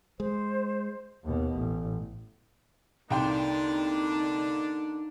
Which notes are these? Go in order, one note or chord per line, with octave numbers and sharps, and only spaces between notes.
G#3 C5
D#2 B2
A1
C2 D3 A#3 D4 D#4 G5 C6